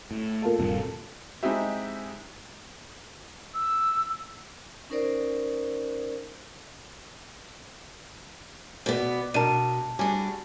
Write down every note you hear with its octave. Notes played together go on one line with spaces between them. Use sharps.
A2
A#3 F4 A4
D#1 G2 C3
G#3 C4 D#4 E4 G4 E5
E6
C#4 D#4 A#4 C5 D5
B2 B3 D5
B2 D4 A#4 A5 D#7
G3 D4 F#4 G#4 G#5